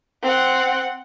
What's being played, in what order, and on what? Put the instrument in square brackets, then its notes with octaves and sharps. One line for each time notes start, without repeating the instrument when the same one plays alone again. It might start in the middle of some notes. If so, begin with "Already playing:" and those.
[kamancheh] C4 F#5